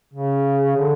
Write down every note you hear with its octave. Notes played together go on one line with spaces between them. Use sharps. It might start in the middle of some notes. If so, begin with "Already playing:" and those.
C#3
D3